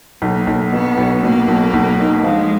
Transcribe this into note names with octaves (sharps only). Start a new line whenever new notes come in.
B1 A#3
B1
B2 B3
B1
B2 A#3
B1
B1
D#4
F3 G#3